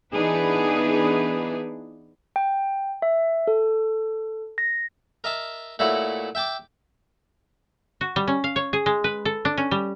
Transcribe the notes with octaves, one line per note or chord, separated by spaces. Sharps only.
E3 B3 D4 D#4 G#4 B4
G5
E5
A4
A#6
A#4 D#5 E5 A5
A#2 A3 E4 F#4 C#5
E5 G5 A5 D6
F#4
G3
C#4
F5
C#5
G#4
G#3
B4
A4
D4
C#4
G3